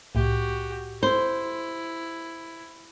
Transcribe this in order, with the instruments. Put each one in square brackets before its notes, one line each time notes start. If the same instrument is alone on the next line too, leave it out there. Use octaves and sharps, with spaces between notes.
[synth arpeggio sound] C2 A2 [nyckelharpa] F#4 G4
[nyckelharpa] E4 [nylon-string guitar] C5